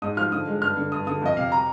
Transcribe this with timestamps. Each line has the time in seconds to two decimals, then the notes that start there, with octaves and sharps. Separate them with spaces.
0.02 G#2 D#6
0.17 F3 F6
0.32 D3 D#6
0.47 G#3
0.62 G2 F6
0.77 D3
0.92 G2 D#6
1.07 D3 D#6
1.21 F2 D#5
1.37 C3 F5
1.52 A#5